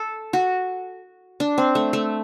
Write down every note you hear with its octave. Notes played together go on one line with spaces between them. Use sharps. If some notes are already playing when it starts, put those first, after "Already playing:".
Already playing: A4
F#4
D4
C4
A3
A3